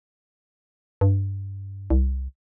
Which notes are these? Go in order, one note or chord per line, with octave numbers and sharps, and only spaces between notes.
G2
C2